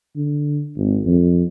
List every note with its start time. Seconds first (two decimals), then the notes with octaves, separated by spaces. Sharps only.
0.16 D3
0.77 G#1
1.06 F2